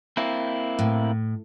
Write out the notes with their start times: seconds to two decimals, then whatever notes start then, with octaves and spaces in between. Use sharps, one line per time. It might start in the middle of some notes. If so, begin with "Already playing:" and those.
0.17 A#3 C4 E4
0.79 A2